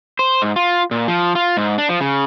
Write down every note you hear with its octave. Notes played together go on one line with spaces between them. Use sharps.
C5
G#2
F4
A#2
F3
F4
G#2
D4
F3
C#3